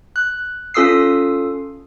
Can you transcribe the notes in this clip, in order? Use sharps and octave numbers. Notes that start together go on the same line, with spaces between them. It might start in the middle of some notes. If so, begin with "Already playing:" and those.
F#6
C#4 F4 A4 D#6 E6 C7